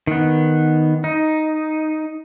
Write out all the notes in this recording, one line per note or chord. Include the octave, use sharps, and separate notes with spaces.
D#3 B3
D#4